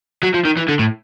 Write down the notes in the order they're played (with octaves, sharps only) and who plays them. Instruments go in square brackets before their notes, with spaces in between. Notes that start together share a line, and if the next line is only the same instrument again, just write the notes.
[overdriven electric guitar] F#3
F3
D#3
E3
D3
A2